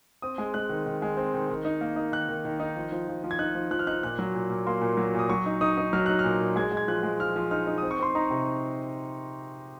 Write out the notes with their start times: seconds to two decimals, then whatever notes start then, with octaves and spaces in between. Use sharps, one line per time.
0.22 C4 D#6
0.38 G#3
0.54 G#3 F#6
0.69 D#3
0.86 D#3
1.02 G#3
1.17 C4
1.34 D#3
1.50 D#3
1.65 D#4
1.81 A#3
1.96 D#4
2.12 D#3 F#6
2.28 D#3
2.45 D#3
2.60 D#4
2.76 F3
2.92 F3
3.08 F3
3.24 F3
3.31 G#6
3.39 D#4 F#6
3.55 F3
3.71 F3 F#6
3.79 F6
3.87 D#4 F#6
4.03 A#2 F#6
4.19 F#3
4.35 A#2
4.50 A#2
4.66 A#3 C6
4.81 A#2
4.97 F#3
5.14 A#2 D#6
5.29 F#3 C#6
5.46 D#4
5.61 D#4 D#6
5.78 D#4
5.93 F#3 F6
6.06 D#4 F#6
6.19 A#2 F6
6.40 A#2
6.56 G#3 G#6
6.72 G#3
6.77 G#6
6.88 F3 F#6
7.03 G#3
7.20 F3 F6
7.36 F3
7.51 D#4 F6
7.67 D#4
7.78 C4 D#6
7.91 C#6
7.99 C4 C6
8.15 D#4 A#5
8.30 C3